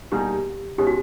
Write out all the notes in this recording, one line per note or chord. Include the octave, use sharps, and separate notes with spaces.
B2 G3 A#3 D#4 G4 G#4
B2 G#3 C#4 G4
F#4